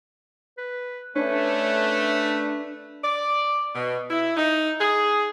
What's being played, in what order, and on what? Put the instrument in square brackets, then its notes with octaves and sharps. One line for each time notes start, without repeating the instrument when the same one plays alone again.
[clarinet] B4
[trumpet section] A3 [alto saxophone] C#4 [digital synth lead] D4 [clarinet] B4
[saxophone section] D5
B2
E4
D#4
G#4